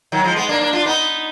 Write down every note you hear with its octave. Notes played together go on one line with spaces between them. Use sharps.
D#3 F#3
F3 G#3
G#3 B3
A#3 D4
A#3 D4
D4 F4
B3 D#4